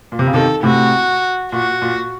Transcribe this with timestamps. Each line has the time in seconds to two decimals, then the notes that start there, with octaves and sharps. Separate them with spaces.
0.12 A#2
0.19 C3
0.27 C#3
0.34 C3 D#3 A4
0.63 A2 C3 F#4
1.52 A#2 F#4
1.82 A#2